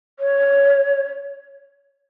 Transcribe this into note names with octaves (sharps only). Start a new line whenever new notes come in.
C#5